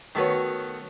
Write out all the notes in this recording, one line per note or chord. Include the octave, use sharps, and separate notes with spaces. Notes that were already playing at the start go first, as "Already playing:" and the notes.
D#3 A3 B3 F#4 B4 C#5